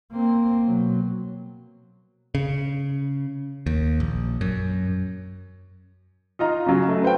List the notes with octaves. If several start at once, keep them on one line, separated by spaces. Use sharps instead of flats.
A#3 C4
B2 F#3
C#3
D#2
A#1
F#2
D#4 F4 D#5 A#5
C#3 F#3 C#4
A3
B4 C5 F5 G5